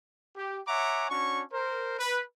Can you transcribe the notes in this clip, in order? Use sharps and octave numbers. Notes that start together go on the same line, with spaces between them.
G4
C#5 E5 F#5 G#5 A#5 D6
C#4 D4 F#4 C#5 C#6
A#4 C5
B4